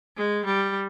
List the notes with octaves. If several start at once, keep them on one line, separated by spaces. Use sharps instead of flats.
G#3
G3